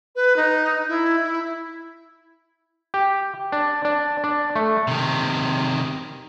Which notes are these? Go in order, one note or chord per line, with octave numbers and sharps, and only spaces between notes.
B4
D#4
E4
E4
G4
D4
D4
D4
A3
C3 D#3